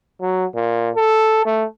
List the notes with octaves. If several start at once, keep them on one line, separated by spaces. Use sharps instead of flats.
F#3
A#2
A4
A3